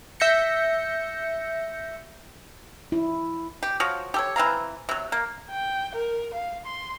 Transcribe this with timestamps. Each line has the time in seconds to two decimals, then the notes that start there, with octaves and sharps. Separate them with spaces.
0.20 E5 G6 A#6 C#7
2.92 E4
3.63 G4
3.80 F3 F#4 C#5 F5
4.14 G4 A4 C#5
4.36 E3 C4 F5 A#5
4.89 C3 F#3
5.12 A#3
5.51 G5
5.95 A#4
6.34 F5
6.65 C6